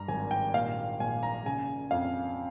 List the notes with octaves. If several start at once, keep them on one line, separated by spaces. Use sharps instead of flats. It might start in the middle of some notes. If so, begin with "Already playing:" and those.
Already playing: G2 A#5
G#1 G#5
G5
A#2 F5
A#1 G#5
A#5
C#3 G#5
F2 F5